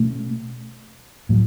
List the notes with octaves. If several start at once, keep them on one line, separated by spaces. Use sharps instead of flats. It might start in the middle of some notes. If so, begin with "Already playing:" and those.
Already playing: B2 A3 C#4
A2 F#3